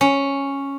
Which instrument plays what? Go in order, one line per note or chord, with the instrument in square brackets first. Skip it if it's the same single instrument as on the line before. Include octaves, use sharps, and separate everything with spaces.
[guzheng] C#4